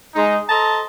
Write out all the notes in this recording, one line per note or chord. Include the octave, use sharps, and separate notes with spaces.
G#3 D#4
A4 C5 D#5 A5 A#5